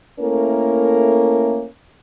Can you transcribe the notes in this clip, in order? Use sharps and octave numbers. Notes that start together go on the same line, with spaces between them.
A3 A#3 C#4 E4 A4 A#4